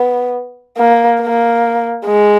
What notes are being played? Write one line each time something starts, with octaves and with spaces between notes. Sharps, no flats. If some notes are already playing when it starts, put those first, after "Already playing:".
Already playing: B3
A#3
A#3
G#3